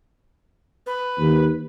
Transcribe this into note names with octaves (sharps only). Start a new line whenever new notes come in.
B4
D#2